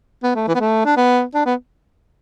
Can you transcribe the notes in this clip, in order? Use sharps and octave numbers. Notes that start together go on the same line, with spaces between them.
B3
A3
E3
B3
A3
D4
B3
D4
B3